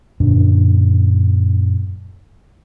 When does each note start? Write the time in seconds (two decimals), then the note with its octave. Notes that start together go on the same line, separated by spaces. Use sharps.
0.20 F#2 A#2 D3 D4